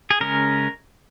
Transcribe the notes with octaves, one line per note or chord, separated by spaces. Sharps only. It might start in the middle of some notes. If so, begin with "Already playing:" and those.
G#4
C#3 G#3 C#4 A#4